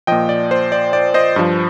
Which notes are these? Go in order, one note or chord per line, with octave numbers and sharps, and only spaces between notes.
A#2 F3 D#5 G5
D5
C5
D5
D5
C5 D#5
G2 F3